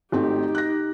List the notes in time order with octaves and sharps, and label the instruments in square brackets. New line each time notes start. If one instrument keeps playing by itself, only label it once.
[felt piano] G#1 A3 C4 [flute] D#4 [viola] G4
[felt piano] F#6 A#6